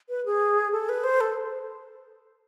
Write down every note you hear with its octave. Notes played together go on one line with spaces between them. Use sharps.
B4
G#4
A4
B4
C5
A4